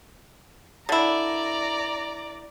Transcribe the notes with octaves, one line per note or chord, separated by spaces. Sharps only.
D3 E4 D5 A#5